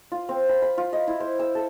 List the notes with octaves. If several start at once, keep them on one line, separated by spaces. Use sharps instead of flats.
F4
C4
B5
B5
F4
D#5
E4
C5
E6
A4